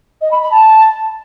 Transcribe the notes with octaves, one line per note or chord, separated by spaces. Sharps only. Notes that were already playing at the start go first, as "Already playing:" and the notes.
D#5
B5
B5
A5